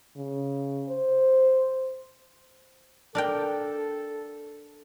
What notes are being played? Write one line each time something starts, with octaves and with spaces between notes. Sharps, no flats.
C#3
C5
D4 A4 A#4 G5